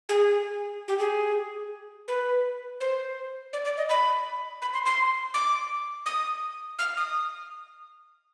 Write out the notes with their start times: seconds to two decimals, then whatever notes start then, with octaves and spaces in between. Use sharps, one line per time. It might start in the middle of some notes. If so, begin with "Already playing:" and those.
0.09 G#4
0.88 G4
0.99 G#4
2.08 B4
2.80 C5
3.53 D5
3.65 D5
3.77 D#5
3.89 B5
4.62 B5
4.73 C6
4.86 C6
5.34 D6
6.06 D#6
6.79 F6
6.97 D#6